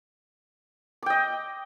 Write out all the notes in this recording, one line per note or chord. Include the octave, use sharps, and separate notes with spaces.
D#5 G5 D6